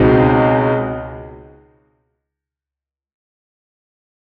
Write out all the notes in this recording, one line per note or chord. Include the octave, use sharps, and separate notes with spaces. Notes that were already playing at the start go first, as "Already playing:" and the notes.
Already playing: C#2 B2 G#3 C4 D#4